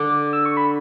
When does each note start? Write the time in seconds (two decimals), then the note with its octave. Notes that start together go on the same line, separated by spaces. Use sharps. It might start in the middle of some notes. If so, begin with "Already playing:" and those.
Already playing: D3 D6
0.33 E6
0.45 C#6
0.57 B5